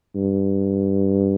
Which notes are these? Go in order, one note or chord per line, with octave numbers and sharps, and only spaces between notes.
G2